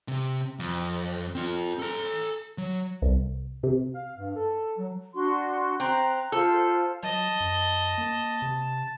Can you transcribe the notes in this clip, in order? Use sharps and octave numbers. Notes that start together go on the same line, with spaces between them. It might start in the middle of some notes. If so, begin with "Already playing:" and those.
C3
F2
C4 F4
A4 A#5
F#3
C2
C3
F5
G2
A4
F#3
D4 F#4 C6
C4 A#5 F#6
F4 A4 C5
F#3 D#5 A5
F#2
A#3
C3